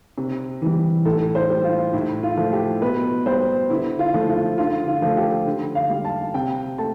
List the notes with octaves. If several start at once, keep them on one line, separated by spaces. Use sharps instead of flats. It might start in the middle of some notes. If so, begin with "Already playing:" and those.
C3
E3 G3
A2 A4
C5
G3
F4
A2 E4
F4
F3 A3
G4
B2 B4
G3 C5
D3 E4
F4
F3 A3
F4
D3 F4
F4
F3 A3
G4
D3
F5
G3
A5
C3 G5
A3 A5